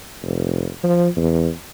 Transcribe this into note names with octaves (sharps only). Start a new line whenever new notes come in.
F1
F3
E2